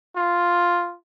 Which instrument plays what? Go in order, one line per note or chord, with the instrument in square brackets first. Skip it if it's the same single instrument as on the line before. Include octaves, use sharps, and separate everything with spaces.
[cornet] F4